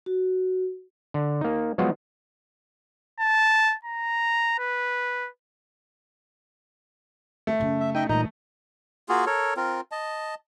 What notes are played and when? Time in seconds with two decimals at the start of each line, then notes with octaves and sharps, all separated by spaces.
0.06 F#4
1.14 D3
1.41 A#3 D#4
1.78 F3 F#3 G#3 B3 F4 F#4
3.20 A5
3.85 A#5
4.59 B4
7.47 A3
7.60 F#2 C#3
7.80 E5
7.95 D#4 D#5 E5 G5
8.10 A#2 E3 G3 D#4 D#5 A#5
9.09 A#3 F4 F#4 G#4
9.26 A4 A#4 C#5
9.57 C4 F4 A#4
9.92 D#5 A5